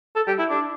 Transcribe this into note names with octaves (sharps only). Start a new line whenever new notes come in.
A4
G4
E4
D4